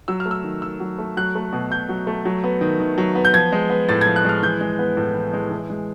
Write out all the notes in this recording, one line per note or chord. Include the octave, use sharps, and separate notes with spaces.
F#3 E6
F6
A3
E6
D#3
D#3 E6
F#3
A3
F#3 F#6
A3
B2
B2 G6
F#3
A3
F#3
B3
D#3
D#3
F#3
B3
G6
F3 G#6
G#3
B3
A2 A6
G#6
F3
F#6
G#3 F6
E3 G6
G#3
B3
A2
E3
G#3
E3
G#3